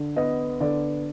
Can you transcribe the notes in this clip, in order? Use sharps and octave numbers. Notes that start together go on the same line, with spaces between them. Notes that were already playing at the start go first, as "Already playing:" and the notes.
Already playing: D3
B3 D#5
D3 D5